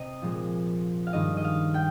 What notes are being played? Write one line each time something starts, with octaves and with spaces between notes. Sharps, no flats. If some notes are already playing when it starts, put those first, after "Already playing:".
Already playing: C3 D#5
A#2 F3 G#3
F5
G2 D#3 G#3 D#5
D#5
F5
G5